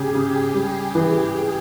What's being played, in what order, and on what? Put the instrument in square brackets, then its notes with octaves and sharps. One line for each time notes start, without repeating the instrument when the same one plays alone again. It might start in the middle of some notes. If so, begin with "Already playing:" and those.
Already playing: [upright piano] C#3 [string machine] G4 G#4
[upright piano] C#3
G3
E3